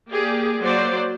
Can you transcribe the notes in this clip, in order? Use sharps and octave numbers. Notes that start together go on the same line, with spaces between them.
A#3 G4 G#4 D5
F#3 A#3 C5 D5